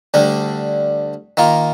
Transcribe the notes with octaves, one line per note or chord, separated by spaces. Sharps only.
D2 D3 G3 D4
D#3 A#3 F4